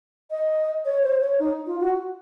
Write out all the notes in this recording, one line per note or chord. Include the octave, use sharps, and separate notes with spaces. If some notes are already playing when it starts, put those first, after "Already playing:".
D#5
C#5
C5
C#5
D#4
F4
F#4